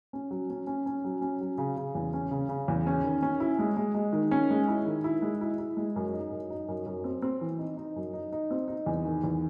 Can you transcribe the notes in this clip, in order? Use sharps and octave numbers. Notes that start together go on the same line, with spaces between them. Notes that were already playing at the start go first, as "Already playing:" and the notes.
C#4
F#3
C#4
C#4
C#4
F#3
C#4
F#3
C#3
C#3
E2
C#4
C#3
C#3
E2
C#4
D#3
C#4
E4
G#3
G#3
G#3
D#3
C#4
G#3
E4
D#3
E4
G#3
E4
E4
G#3
F#2
D#4
F#2
D#4
F#2
F#2
C4
C4
E3
D#4
D#4
F#2
D#4
D#4
C4
D#4
E2
D#3
E2